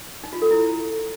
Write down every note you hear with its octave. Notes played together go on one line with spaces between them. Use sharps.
D#4
F4
A4
E4